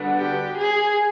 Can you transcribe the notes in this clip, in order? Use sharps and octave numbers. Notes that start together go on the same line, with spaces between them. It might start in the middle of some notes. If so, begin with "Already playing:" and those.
Already playing: D3 G3 B3 D4 F#4
G4
G#4